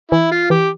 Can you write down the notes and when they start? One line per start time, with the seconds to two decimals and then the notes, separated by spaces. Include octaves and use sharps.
0.11 E3 E4
0.31 F4
0.50 E3 G4